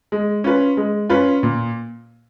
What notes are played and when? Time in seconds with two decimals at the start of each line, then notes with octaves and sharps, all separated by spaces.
0.12 G#3
0.44 C#4 F4 B4
0.77 G#3
1.10 C#4 F4 B4
1.43 A#2